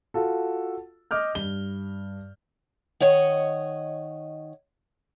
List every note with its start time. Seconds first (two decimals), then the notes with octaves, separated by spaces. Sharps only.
0.14 F4 F#4 A4
1.11 D#5 D6 F6 G6
1.35 G2 G7
3.00 D#3 C#5 D#5 F#5